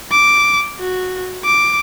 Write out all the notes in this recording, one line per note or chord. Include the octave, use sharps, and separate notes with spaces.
D6
F#4
D6